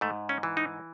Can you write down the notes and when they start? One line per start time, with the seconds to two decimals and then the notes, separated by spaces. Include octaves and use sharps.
0.01 G#2 A3
0.29 C#4
0.43 E3
0.57 D#4